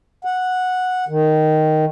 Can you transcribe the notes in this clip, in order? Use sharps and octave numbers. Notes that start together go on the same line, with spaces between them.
F#5
D#3